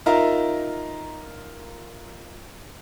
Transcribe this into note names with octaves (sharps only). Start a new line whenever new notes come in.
D#4 F4 A#4 E5 A#5